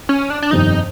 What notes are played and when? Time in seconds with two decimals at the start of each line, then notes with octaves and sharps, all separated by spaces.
0.09 C#4
0.30 D4
0.42 D4
0.51 G1 F2 C3 D#3 D#4